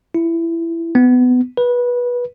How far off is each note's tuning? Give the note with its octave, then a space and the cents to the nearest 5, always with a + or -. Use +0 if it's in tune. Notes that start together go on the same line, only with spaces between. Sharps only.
E4 +15
B3 +20
B4 -20